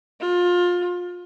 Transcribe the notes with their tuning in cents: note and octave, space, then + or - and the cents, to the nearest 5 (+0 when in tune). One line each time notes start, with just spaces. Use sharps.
F4 +25